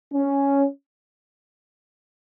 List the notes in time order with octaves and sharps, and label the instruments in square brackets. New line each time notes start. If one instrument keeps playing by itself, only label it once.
[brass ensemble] C#4